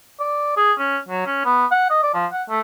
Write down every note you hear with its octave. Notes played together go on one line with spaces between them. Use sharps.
D5
G#4
C#4
F#3
C#4
B3
F#5
D#5
D5
F3
F#5
A3